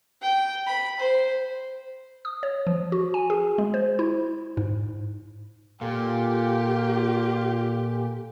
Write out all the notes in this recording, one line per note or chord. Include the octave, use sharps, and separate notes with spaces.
G5
B5
C5
D#6
C#5
F3
F#4
G#5
G#4
G#3
C5
E4
G#2
A#2 F4 G4 A4